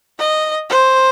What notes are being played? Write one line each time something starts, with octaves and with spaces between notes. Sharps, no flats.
D#5
C5